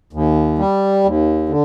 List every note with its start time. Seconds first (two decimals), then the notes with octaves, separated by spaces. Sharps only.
0.13 D#2
0.59 G3
1.04 D#2
1.49 D3